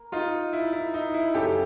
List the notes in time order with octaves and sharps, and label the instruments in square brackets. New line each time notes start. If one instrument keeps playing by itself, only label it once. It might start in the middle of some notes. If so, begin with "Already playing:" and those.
Already playing: [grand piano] A#3
D#4 F4
E4
E4
D#4
E4
F#2 C#3 F#3 G4 A4